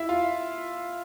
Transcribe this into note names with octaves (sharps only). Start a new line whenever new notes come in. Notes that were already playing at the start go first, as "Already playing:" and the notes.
Already playing: E4 E5
F4 F5